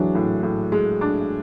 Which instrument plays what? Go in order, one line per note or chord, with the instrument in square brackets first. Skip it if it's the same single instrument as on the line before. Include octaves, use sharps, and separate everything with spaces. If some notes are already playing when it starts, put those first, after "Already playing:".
Already playing: [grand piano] E3 F#3 [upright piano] G#3 D4
[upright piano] A2
A2
G#3
D4